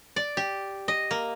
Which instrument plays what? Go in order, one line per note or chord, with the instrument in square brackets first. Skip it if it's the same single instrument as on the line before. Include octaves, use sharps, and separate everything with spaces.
[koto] D5
G4
D#5
A#3